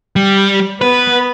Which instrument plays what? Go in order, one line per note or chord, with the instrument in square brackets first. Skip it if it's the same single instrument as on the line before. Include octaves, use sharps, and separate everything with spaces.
[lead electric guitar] G3
[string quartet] B3 [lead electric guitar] B4